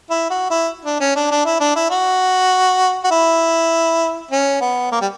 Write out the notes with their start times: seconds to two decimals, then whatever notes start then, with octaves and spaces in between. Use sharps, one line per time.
0.10 E4
0.30 F#4
0.51 E4
0.85 D4
1.00 C#4
1.16 D4
1.31 D4
1.45 E4
1.60 D4
1.76 E4
1.90 F#4
3.04 F#4
3.11 E4
4.31 C#4
4.61 B3
4.92 A#3
5.02 G3